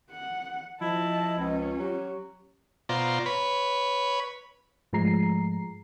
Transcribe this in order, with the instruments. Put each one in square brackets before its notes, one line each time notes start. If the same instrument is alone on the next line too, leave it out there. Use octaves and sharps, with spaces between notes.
[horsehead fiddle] F#5
[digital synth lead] F3 [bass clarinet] E4 [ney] D#5 [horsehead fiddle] A5
[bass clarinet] C#2 [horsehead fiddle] C#4
[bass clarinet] F#3 [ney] G4
[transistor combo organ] B2 F4 C5 D5 A#5
B4 C#5 B5
[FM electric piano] G#2 F3 G#3 A3 A#5 C7